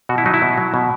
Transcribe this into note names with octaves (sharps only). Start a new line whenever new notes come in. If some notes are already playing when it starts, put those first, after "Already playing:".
B2 F#4
E4
F#3 D#4
E4
B2
F#3
B2